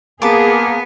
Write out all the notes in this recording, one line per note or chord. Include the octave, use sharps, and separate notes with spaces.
A#3 B3 G#4 A5 D6